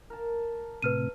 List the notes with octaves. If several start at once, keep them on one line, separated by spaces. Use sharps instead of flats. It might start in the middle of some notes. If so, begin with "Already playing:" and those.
A#4 A5
A2 C3 B4 F6 D#7